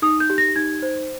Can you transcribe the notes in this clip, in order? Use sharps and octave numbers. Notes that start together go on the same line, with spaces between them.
D#4 D#6
G6
G4
A#6
D#4 G#6
C5